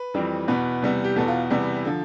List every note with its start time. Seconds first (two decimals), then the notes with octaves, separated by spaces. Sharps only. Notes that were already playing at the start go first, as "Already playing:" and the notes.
Already playing: B4
0.14 F2 E3 G3 C4
0.48 E2 B2 B3 B4
0.82 E2 C3 G3 B3
1.04 G4
1.16 E2 B2 B3 A4
1.28 F4
1.50 E2 C3 G3 B3
1.85 D3 F3